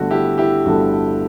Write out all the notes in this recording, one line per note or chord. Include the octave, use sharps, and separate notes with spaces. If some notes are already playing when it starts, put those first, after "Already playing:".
Already playing: G1 G2 D3 A3 F#4
E4 G4
E4 G4
G1 G2 D3 A3 F#4